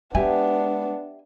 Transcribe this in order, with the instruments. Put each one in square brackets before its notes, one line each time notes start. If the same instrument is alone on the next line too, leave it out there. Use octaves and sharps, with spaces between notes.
[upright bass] G#3 [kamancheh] B3 D4 [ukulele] G4 E5 G#5